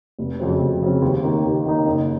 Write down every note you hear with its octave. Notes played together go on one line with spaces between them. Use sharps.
F1
F2 C#3 F#3 C4
F1
F2 C#3 F#3 C4
D#2
D#3 A#3 D#4
D#2
D#3 A#3 D#4
F#1